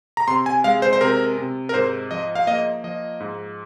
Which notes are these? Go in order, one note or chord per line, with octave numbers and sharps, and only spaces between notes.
A#5
C3 C6
G#5
G#3 F5
C5
C5
C3 A#4
C3
A#4
G#2 C5
F3 D#5
F5
A#3 D#5
F3 D#5
G#2